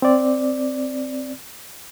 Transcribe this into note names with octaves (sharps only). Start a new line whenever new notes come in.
C4 D5